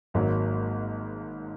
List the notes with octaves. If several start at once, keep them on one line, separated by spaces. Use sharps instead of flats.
G#1 G#2 F#3 A#3